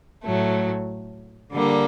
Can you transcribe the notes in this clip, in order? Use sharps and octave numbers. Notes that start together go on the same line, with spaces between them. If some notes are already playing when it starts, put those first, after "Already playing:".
A2 F#3 A3
D3 G3 A#3